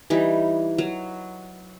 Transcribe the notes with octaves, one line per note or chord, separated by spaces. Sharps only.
E3 G3 D#4
F#3